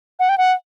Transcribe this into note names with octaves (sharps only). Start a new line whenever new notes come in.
F#5
G5
F#5